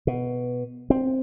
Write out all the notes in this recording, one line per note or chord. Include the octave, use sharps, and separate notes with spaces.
B2
C4